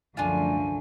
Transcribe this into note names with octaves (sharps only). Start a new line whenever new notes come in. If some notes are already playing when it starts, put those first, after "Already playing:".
C2 F#2 D3 F3 A3 D4 F4 G#5